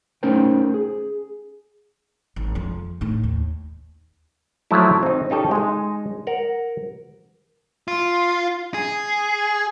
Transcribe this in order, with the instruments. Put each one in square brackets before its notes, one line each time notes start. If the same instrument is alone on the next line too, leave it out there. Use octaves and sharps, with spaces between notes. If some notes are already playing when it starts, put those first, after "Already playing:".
[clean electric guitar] A3 C#4 D#4 A#4 C5 G5
G#4
[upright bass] G#1
F2 F3
A2 D#3
D#2
[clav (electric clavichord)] F3 F#3 A3 E4
C4 D#4
C#4 D#4 G4 A4
G#3 D#4
A#4 F#5
[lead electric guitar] F4
G#4